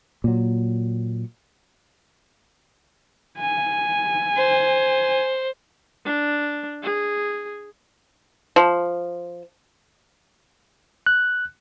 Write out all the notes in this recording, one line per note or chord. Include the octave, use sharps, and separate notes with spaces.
A#2 F#3
G#5
C5
D4
G#4
F3
F#6